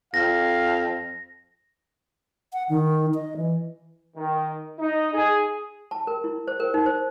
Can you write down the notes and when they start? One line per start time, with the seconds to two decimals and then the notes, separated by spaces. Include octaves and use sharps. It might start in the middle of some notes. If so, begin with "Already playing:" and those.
0.14 F2 F5 A#6
2.53 F#5
2.69 D#3
3.15 D#5
3.37 E3
4.17 D#3
4.79 D#4
5.14 G#4
5.91 A5
6.07 A#4
6.24 E4
6.48 C5
6.60 A#4
6.74 D#4
6.86 C5